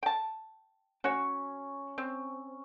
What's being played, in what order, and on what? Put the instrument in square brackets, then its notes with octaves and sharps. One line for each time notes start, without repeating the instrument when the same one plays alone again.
[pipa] G5 A5
[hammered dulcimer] C#4 [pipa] F#4 C#5
[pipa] C4